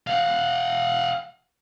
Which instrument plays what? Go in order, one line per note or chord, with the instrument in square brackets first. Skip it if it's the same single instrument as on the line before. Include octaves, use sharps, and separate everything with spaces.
[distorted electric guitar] F5 F#5